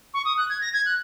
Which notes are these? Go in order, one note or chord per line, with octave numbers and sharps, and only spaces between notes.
C#6
D#6
F#6
G#6
A#6
G#6
F#6